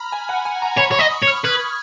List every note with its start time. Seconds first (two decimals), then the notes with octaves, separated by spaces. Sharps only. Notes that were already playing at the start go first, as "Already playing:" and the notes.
Already playing: A#5 B5 F6
0.12 G#5
0.29 F#5
0.45 G#5
0.62 A#5
0.78 C#5 B5
0.92 C#5 C#6
1.00 D#5
1.11 D#6
1.22 C#5
1.27 F6
1.44 B4 G#6
1.60 G#6